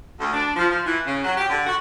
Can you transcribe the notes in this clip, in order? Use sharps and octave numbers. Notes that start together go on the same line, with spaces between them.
D2
D4
F3
F3
E3
C#3
F#3
G4
D3
F#4